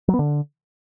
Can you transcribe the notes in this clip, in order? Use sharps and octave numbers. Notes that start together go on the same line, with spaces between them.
F#3
B3
D3